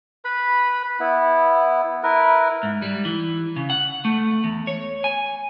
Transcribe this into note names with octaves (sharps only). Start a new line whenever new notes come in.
B4 B5
B3 E4
E4 A#4 B4
G#2
G3
E3
C#3
F#5
A3
E2
C#5
G#5